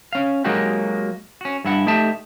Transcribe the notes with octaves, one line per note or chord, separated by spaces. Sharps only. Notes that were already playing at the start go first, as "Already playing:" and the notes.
C#4 F5
F#3 G#3 A#3 D#4 F#4 G4
C#4 F#4
G2 E4 F#5
A3 D#4 G4 E5 A5